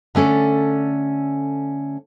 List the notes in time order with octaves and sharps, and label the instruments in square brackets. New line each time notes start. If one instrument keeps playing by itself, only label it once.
[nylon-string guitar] D3 A3 C#4 A4 D5